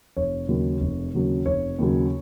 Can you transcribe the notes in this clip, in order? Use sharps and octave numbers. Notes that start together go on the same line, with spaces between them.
F1 C#5
D#2 C#3 F#3
F1
D#2 C#3 F#3
F1 C#5
D#2 C#3 F#3